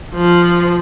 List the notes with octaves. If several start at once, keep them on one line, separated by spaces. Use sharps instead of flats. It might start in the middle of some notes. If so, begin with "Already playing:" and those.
F3